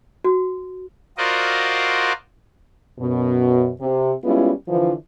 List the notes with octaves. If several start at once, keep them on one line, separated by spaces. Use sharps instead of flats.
F#4
F4 F#4 A#4 C5 D5 D#5
F#2 B2
C3
G3 G#3 B3 C#4 E4 F4
D3 E3 F3